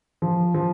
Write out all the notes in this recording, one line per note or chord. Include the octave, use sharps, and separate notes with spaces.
F3
F3